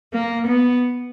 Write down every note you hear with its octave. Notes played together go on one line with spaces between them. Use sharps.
A#3
B3